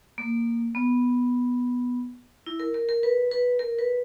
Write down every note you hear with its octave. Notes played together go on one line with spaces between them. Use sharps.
A#3
B3
E4
A#4
A#4
A#4
B4
B4
A#4
B4